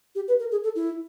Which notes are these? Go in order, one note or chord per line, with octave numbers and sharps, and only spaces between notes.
G4
B4
A#4
G#4
A4
E4